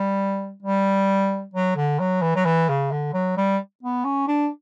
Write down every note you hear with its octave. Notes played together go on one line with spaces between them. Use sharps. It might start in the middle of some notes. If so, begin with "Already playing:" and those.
Already playing: G3
G3
F#3
D3
F#3
E3
F#3
E3
C#3
D3
F#3
G3
B3
C#4
D4